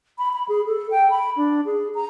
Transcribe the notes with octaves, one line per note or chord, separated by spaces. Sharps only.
B5
B5
G#4
A4
G5
B5
D4
G#4
A#5